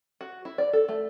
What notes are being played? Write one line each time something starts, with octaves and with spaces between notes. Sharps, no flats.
F#4
E4
D5
A4
A3